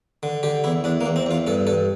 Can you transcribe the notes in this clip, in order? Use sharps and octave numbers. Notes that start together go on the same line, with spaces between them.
D3
D3 G4
E2 E4
E2 D4
A#3
E2
C4
E2 F4
G2 A4
G2 A4